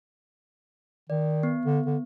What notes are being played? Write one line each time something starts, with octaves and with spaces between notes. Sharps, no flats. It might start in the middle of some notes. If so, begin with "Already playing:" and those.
D#3 D5
B3
D3
D3